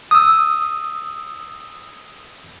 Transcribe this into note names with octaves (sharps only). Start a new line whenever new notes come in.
D#6 E6